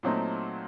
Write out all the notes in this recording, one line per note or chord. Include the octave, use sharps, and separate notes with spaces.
A#2 F#3 A3 C4 D#4